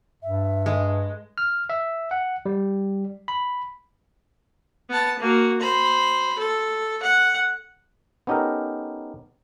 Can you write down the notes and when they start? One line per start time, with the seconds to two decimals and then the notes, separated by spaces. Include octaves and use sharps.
0.23 G2 E5
0.66 G#3
1.38 F6
1.70 E5
2.11 F#5
2.46 G3
3.28 B5
4.89 B3 A5
5.19 A#3 F#4
5.61 C5 B5
6.39 A4
7.02 F#5
8.27 B3 C#4 D#4 G4 A4 A#4